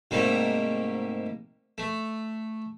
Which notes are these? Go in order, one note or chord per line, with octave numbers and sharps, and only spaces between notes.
G#2 C3 G3 A3 A#3
A3